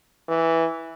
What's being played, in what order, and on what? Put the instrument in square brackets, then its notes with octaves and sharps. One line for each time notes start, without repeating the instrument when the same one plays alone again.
[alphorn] E3